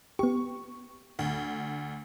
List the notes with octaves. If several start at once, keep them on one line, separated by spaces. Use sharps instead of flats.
B3 G4 C#6
D2